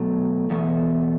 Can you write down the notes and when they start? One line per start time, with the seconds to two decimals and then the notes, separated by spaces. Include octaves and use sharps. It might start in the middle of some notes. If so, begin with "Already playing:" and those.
Already playing: B2 F#3 A3
0.50 E2 B2 A3